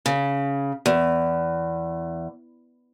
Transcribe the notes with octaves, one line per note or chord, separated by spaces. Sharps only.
C#3
E2